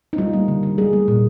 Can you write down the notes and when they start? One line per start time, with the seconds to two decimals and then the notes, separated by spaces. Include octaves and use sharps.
0.13 D#4
0.18 G3 F4
0.33 A#3
0.48 D3
0.63 D3
0.78 G3 G#4
0.93 A#3
1.08 A#2